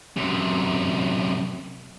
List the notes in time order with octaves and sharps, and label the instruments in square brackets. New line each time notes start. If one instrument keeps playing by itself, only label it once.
[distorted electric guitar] F#2 C3